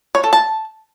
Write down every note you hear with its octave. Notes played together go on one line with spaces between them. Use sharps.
C#5
A4
A5